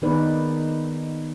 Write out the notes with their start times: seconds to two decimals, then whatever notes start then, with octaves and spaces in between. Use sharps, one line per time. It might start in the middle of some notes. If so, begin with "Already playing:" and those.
0.02 D#3 B3 D#4 G#4 B4 D5